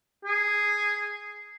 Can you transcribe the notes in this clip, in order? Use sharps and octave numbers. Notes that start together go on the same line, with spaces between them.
G#4